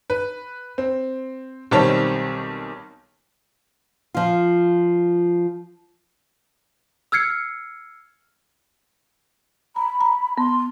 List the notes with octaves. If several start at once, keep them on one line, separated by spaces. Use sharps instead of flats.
B4
C4
B1 D#3 G3 C4 C#5 A5
F3 F4
E6 F6 G#6 C7 C#7
A#5 B5
A#5
B3 C6